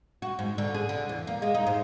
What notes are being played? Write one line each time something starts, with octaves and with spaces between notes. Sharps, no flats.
F#4
G#2
D3
G#4
D3
E2
A#3
G#3
D#4
G#2